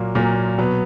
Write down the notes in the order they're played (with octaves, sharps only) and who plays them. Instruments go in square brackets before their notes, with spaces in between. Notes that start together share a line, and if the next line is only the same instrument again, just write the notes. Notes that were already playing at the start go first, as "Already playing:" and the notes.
Already playing: [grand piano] A#2 F#3 A#3
A#2 F#3 A#3
B2 F#3 B3